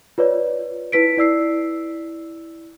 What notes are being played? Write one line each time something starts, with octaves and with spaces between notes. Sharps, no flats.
F4 B4 C#5 D5
E4 B4 B6 D7
E4 D5 E6 C7